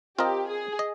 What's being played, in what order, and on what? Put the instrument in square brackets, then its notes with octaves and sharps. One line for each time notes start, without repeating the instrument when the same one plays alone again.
[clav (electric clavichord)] C4 F4 A#4 D#5 [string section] G4
[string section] G#4
[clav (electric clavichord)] D#5